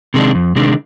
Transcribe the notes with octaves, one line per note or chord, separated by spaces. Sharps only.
C3 D#3 G#3 D4
F2
C3 D#3 G#3 D4